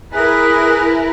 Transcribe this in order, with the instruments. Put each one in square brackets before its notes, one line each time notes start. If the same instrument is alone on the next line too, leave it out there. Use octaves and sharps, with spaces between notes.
[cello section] E4 A#4 B4 [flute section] G#4 G#5 F#6